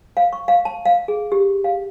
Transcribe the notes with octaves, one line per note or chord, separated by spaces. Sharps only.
F5
C#6
F5
A5
F5
G#4
G4
F5